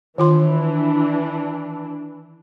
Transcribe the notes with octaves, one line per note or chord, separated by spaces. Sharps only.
D#3 E3 D4 F4 C6